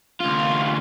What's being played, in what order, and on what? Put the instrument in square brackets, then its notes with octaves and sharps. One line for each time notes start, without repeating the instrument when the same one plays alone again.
[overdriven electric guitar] D2 F4